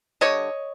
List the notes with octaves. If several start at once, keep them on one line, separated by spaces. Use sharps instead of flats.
D3 G3 C#5 D#5